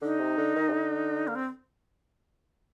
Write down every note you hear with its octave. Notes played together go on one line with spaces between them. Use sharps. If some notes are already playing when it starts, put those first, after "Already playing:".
D3 D#4
C3
D3
D#3
C3
D3
A#3
C4